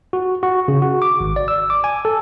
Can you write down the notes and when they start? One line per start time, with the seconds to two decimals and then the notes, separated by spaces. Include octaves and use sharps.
0.13 F#4
0.43 F#4
0.68 C#3
0.82 F#4
1.02 D6
1.20 G#1
1.36 D5
1.48 E6
1.70 D6
1.84 G#5
2.05 A4